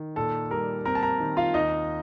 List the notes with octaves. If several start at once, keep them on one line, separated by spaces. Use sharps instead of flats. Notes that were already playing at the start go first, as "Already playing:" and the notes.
Already playing: D#3
A#2 A4 A5
G3 A#4 A#5
C4 A#4 A#5
A5
A#4 A#5
D#3
F4 F5
D#2 D#4 D#5